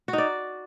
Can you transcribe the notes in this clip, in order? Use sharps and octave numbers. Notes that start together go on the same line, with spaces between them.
F#4
D#4
D5